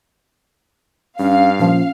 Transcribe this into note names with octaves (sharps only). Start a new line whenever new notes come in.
G2 C#4 F5
A#2 F3 C#4